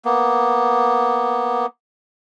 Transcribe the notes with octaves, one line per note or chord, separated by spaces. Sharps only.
A#3 B3